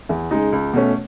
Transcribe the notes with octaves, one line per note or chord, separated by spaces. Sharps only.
E2
C#3 G#3 D#4
C#2
B2 A3 C#4